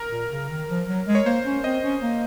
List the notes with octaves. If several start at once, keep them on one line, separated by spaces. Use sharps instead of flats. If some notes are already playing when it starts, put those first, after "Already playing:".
Already playing: A#4
A#2
C#3
D#3
F3
F#3
G#3
C#5
A#3 C5
C#4
C4 D#5
C#4
A#3